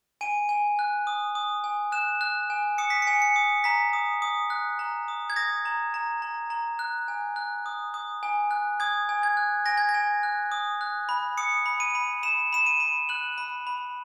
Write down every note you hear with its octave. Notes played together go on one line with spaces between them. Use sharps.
G#5 D#7
G#5
F#6
D#6
D#6
G#5
F#6 E7
F#6
G#5
D#6 C#7
B6
C#7
G#5
C#7
D#6
A#5 B6
D#6
D#6
F#6
A#5
D#6
G#6
D#6 A#6
A#5
A#5
A#5
A#5
F#6
G#5
F#6
D#6
D#6
G#5
F#6
D#6 G#6
G#5
G#6
F#6
G#5 A#6
G#6
A#6
G#5
F#6
D#6
F#6
B5
D#6 C#7
B5
D#7
B5
B5 E7
B5 E7
D#7
B5
F#6 F#7
B5
B5